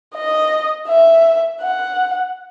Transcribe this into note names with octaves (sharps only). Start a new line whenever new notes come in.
D#5
E5
F#5